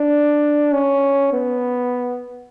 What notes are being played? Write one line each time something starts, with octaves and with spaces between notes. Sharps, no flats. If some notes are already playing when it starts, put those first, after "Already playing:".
Already playing: D4
C#4
B3